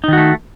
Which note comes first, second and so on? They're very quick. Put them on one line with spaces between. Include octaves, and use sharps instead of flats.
D#4 D#3 F#4 A3